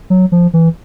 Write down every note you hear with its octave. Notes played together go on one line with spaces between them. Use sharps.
F#3
F3
E3